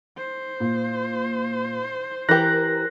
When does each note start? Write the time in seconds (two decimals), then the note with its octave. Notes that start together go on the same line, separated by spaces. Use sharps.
0.17 C5
0.60 A#2
2.29 E3 G4 A#4 F#6 A#6